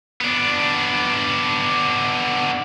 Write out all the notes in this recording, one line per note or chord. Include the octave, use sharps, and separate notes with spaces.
B3 D4